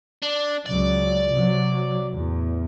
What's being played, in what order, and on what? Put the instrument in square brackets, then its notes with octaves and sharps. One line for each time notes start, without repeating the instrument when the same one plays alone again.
[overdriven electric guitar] D4
[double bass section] C#2 F#3 [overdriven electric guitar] D5
[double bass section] C3 F#3
E2 A2